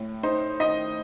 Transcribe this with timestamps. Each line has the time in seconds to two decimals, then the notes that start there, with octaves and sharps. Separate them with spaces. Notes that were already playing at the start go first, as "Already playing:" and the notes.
Already playing: A2
0.23 D#4 C5
0.60 D#3 D#5